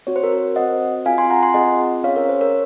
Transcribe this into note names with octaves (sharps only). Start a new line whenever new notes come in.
C4 F#4 C#5
C5
A#4
C5
C4 F#4 D#5 F#5
C4 F4 G#4 F5 G#5
G#5 C6
F#5 A#5
G#5 C6
C4 F4 G#4 D#5 F#5
C#4 G#4 C#5 F5
A#4 C#5
C5
A#4 C#5